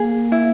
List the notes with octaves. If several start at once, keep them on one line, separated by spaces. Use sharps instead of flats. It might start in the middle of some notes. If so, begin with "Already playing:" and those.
Already playing: A#3 G#4
E4